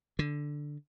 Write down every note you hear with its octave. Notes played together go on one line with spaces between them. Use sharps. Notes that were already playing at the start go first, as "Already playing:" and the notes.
D3